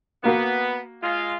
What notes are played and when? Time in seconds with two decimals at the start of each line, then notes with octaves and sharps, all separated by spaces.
0.24 A#3 B3 F#4
1.03 G#3 F4 F5